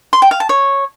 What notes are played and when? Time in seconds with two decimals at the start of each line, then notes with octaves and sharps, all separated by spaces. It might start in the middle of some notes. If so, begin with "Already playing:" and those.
0.13 C6
0.22 G5
0.31 F5
0.40 A5
0.49 C#5